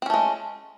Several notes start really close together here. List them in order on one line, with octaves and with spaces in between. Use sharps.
C4 C#4 A3 G#3